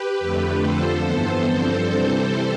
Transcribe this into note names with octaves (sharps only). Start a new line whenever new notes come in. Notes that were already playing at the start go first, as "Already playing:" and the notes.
Already playing: G4 B4
F2 D3 A3
F2 D3 F3 A4 C5
G2 E3 B3
G2 D3 F3 C4
C3 E3 G3 C4 A4 C5